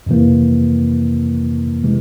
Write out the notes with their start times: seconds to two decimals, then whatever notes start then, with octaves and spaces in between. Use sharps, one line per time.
0.06 F2 C3 E3 A#3
1.84 C3 E3 G#3